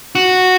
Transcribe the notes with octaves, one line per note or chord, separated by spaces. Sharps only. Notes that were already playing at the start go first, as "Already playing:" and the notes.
F#4